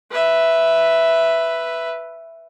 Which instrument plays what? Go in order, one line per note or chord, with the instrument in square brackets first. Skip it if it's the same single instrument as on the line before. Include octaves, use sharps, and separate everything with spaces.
[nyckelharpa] B4 E5